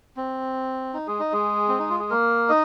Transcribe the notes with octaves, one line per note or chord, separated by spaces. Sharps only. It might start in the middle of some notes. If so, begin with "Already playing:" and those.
C4
D#4
G#3 G#4
D#4 D#5
G#3 G#4
C4
D#4
F4
G#4
A#3 A#4
D#4 D#5